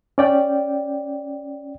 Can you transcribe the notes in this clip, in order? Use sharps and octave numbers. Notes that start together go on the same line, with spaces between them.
C#4 D5 G5